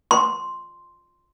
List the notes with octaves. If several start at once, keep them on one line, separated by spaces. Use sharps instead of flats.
C6